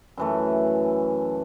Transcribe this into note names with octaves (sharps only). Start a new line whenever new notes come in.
F#2 E3 A3